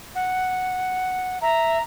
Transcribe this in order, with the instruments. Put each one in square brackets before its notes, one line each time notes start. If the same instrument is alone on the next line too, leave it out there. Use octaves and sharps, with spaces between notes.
[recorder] F#5
[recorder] E5 [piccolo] A#5